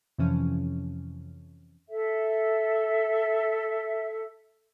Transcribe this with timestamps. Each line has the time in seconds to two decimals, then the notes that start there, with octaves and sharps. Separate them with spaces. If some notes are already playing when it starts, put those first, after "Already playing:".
0.18 F2 C3 E3 F3 C#4
1.89 A4 E5